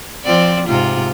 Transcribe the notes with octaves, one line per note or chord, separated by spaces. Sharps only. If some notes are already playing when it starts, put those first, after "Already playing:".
F3 C4 D5
G#2 C3 F4